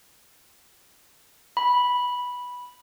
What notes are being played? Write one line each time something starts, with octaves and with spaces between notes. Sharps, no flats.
B5